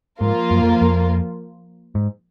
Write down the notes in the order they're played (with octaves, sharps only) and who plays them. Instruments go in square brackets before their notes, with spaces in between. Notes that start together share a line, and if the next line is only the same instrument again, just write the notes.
[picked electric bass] G#2 [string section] F3 A#3 F4 A#4
[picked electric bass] F#2
F2
F2
G#2